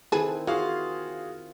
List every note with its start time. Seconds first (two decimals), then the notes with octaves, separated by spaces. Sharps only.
0.12 D#3 C4 E4 G#4 A4 B4
0.47 E3 F4 F#4 G#4 F5